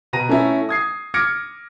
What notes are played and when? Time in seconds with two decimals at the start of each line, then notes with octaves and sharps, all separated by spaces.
0.13 B2 B4 A#5 A#6 D#7
0.29 A3 C#4 E4
0.69 D#6 G#6 C7
1.14 D6 F6 G#6 A#6 C#7 D7